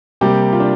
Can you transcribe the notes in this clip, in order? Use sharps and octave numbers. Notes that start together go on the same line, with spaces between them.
C3 G3 A#3 G4
F4
D4